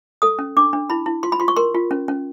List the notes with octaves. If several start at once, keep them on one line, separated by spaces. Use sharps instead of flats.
A4 D#6
C#4
D4 D6
D4
E4 B5
E4
F4 C6
B5
F4 C6
C#6
A#4 C6
F4
C#4
C#4